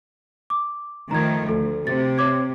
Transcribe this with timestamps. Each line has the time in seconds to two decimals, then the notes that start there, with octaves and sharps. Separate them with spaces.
0.50 D6
1.11 D#3 F3 A3 A#5 G#6
1.49 D2 A4
1.87 C3 A6
2.18 C#5 D6 G#6